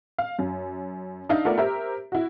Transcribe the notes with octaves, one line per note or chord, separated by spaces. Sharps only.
F5
F#2
D4 D#4 E5 F5
A3 B3 F4 A#4 D5
G4 A#4 C5 E5
E4 F#4